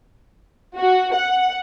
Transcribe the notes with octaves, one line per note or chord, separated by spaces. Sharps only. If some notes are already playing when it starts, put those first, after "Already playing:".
F#4
F#5